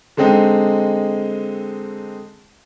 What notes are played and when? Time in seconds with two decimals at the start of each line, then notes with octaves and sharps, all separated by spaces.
0.17 D3 G#3 C4 D#4